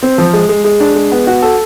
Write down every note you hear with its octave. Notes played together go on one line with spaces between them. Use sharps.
C4
F3
G#3
G#3
G#3
D4
G#3
B3
F#4
A4